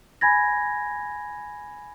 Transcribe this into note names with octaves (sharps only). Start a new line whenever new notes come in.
G#5 B5 G#6 A#6